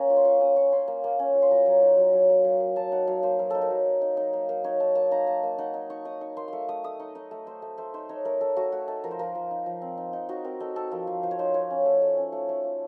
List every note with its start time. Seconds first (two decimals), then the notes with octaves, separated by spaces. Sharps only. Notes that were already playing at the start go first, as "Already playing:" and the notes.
Already playing: A#3 C#4 A#5
0.10 F4
0.17 C6
0.25 F4 C#6
0.40 C#4 D#6
0.56 F4 C#6
0.72 C#4 C6
0.88 A#3
1.04 A#3
1.19 C#4
1.35 F4
1.42 C6
1.51 F#3 A#5
1.66 F#3
1.82 D#4
1.97 F#3
2.13 F#3
2.30 A#3
2.44 F#3
2.60 A#3
2.76 F#3 A5
2.92 D#4 F#5
3.07 F#3 F5
3.23 A#3 C5
3.39 F#3 A#4
3.50 D#4 A4
3.61 A#4
3.70 F#3
3.85 A#3
4.02 D#4
4.17 D#4
4.33 A#3
4.49 A#3
4.64 D#4 C#5
4.80 D#4 A5
4.95 A#3 A5
5.11 D#4 A#5
5.27 A#3 A5
5.43 A#3
5.58 D#4 F#5
5.74 D#4
5.90 D#4 C#6
6.05 D#4 D#6
6.21 D#4 C#6
6.37 A#3 C6
6.48 A3 C6 C#6
6.69 A3 D#6
6.84 A3 D#6
7.00 D#4 C#6
7.15 D#4 D#5
7.31 A3
7.46 A3 C5
7.62 A3
7.78 A3 C5
7.94 D#4 C5
8.09 D#4 C#5
8.25 A3 A#4
8.41 A3 A4
8.56 A3 F#4
8.72 A3 F#4
8.88 D#4 A4
9.04 F3 A#4
9.11 C5
9.19 F3 A#4
9.35 F3
9.51 D#4
9.66 F3
9.82 C4
9.98 D#4
10.13 D#4
10.29 D#4 F#4
10.44 C4 A#4
10.60 D#4 A4
10.76 C4 A4
10.91 F3 A#4
11.07 F3
11.23 F3 C5
11.31 C#5
11.39 D#4 C5
11.54 F4 C#5
11.70 C#4
11.86 A3
12.02 A3
12.17 C#4
12.32 A3
12.49 A3
12.64 F4